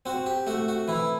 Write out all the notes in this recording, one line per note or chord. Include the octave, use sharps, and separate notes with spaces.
C4 F#4
G4
A3 F#4
F#4
E3 E4